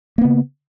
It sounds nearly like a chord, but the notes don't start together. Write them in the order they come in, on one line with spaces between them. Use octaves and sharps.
A#3 B3 C#3